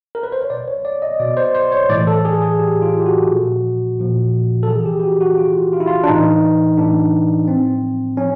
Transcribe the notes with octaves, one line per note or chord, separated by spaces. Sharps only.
A#4
B4
C5
C#5
B2 D5
C#5
D5
D#5
B2 D5
C5
C5
C#5
A2 E3 D5
A4
G#4
G#4
A2 E3 G4
F4
G4
F#4
A#2 F3
A#2 F3
A4
C3 E3 G#4
G#4
G4
G4
F#4
F#4
C3 E3 F4
F4
E4
F4
D4
A2 E3 D#4
A2 E3 D4
A2 F3 C4
F3 C#4